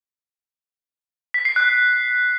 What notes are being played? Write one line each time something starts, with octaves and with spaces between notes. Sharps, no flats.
B6
C7
F#6